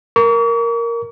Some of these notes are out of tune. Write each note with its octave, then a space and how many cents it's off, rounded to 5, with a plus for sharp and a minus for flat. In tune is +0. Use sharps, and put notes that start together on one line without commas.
A#4 +0 C#6 +45